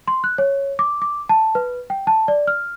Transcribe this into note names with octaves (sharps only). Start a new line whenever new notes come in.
C6
F#6
C#5
D6
D6
A5
B4
G5
A5
D5
F6